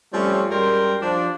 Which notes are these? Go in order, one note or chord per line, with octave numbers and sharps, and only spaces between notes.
F3 G3 A3 C4 C#4
F#2 G3 G#3 A#4 G5 C6
F3 D4